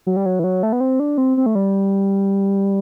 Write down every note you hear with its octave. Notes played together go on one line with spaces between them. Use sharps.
F#3
G3
F#3
E3
F#3
A3
B3
C4
D4
C4
C4
A3
G3